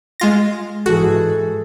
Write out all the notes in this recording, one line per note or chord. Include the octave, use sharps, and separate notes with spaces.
G#3 F4 A#6
G#2 E3 F#4 G#4 A4